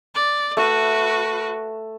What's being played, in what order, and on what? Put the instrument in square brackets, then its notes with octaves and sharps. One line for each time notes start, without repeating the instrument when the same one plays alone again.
[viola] D5
[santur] A3 E5 [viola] F#4 B4